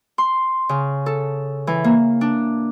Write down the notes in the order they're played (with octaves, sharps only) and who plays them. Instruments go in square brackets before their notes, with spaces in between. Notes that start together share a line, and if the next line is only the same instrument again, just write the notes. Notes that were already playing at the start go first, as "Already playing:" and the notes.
[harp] C6
C#3
A4
E3
A#3
D4